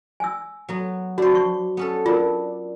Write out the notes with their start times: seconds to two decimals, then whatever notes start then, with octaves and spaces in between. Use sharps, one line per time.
0.20 G#5 E6
0.69 F#3 B3
1.18 D4 F#4 C5
1.35 C#6
1.77 B3 C#4 A4
2.06 D4 F4 A#4